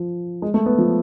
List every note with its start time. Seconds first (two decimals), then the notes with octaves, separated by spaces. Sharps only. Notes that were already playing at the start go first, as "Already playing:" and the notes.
Already playing: F3
0.42 G#3
0.54 A3
0.66 B3
0.78 F3